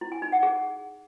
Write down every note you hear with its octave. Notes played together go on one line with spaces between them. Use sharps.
E4
G#5
D#4
F#5
G#4